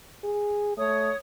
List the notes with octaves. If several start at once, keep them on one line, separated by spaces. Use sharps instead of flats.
G#4
A3 C#5 D#6